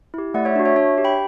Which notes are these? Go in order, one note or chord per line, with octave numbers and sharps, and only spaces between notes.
E4 G4
A3 D5 F#5
C#5 E5
D4 F#4
C#5 E5
D4 C#5 E5
G4
G5 B5